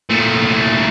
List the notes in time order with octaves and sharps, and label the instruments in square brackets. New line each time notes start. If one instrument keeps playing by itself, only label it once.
[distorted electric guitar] A#2 A3